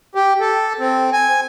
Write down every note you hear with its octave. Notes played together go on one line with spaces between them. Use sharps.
G4
A4
C4
G#5